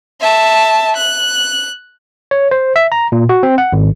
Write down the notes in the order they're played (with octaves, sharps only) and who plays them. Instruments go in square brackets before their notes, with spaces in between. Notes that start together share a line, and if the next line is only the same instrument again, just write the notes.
[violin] E5 A5
F#6
[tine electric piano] C#5
C5
E5
A#5
A#2
F#4
C4
F#5
G#1